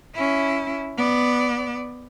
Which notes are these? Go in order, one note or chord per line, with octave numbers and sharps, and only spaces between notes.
C#4 E4
B3 D5